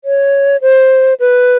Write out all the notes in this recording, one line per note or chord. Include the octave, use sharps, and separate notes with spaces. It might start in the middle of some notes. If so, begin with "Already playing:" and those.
C#5
C5
B4